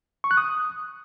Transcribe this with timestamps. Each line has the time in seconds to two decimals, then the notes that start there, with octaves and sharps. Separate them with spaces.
0.24 C#6
0.31 F#6
0.37 D#6